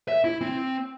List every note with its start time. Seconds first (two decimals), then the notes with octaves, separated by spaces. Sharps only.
0.08 E5
0.24 E4
0.41 C4